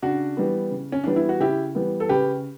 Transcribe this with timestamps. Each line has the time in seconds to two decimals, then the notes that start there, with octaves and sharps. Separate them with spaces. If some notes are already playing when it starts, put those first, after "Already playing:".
0.02 C#3 D4 F#4
0.37 E3 G3 B3
0.71 C#3
0.92 C#4
1.04 E3 G3 B3 D4
1.16 E4
1.29 F#4
1.40 C#3 E4 G4
1.75 E3 G3 B3
2.00 A4
2.09 C#3 G4 B4